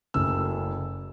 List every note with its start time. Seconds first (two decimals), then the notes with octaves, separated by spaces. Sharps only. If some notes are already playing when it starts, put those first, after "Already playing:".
0.14 F#1 F#2 C#3 A3 E6